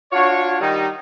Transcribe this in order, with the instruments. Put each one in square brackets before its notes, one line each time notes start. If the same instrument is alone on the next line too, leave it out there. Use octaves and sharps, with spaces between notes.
[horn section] D4 F4 F#4 C#5
D#3 G3 D#4